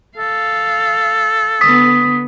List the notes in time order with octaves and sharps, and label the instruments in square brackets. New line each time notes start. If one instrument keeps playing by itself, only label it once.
[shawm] A4 [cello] F5
[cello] D3 B3 [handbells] D#6 B6